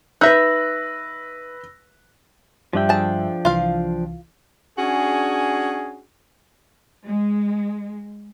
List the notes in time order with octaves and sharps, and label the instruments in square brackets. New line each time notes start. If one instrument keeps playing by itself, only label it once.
[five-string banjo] D#4 E5 [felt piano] B4 F#6 [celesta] E6 A#6
[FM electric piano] G2 G3 E5 [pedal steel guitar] F3 D4 G5
[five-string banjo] G#4 A5
[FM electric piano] C2 E3 [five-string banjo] F4 F5
[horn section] C#4 D4 F#4 G#4
[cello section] G#3